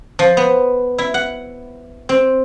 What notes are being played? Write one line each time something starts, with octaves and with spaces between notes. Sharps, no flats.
F3
B3
E4
F#5
C4